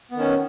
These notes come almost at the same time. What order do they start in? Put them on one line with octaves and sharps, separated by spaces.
B3 D#3 C#4